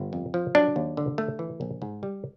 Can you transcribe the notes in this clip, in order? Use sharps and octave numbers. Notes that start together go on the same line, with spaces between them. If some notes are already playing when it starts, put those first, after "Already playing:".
Already playing: G1
F2
F3
F#3 D4
D#2
D3
A3
E3
A#1
G#2
G3